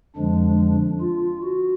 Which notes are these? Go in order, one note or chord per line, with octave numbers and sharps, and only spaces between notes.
F2 D3 F3 G#3 D4
F4
F#4